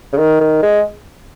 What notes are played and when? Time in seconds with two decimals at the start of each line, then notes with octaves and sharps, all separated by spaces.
0.13 C#3
0.18 D#3
0.41 D#3
0.63 G#3